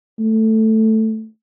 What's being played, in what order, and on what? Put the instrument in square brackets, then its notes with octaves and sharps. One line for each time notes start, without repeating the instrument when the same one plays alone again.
[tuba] A3